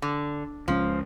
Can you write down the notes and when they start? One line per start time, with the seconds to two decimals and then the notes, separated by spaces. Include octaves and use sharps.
0.02 D3
0.68 C#2 F3 G#3 C#4